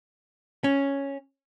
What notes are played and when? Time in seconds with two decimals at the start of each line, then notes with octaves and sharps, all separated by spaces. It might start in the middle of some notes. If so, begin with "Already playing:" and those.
0.64 C#4